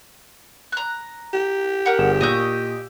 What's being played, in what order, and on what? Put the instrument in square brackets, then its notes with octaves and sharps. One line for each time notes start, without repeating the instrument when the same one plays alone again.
[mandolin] A#5 F#6
[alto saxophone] G4
[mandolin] A#4 F#5
[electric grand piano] G1 G#4 E7
[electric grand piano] A#2 D#6 E6 [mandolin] D#5 C#6 G6